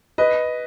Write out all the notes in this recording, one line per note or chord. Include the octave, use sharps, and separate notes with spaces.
B4 D#5